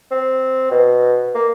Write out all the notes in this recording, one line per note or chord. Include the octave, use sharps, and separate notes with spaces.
C4
B2
A#3